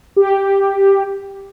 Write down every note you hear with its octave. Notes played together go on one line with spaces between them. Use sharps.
G4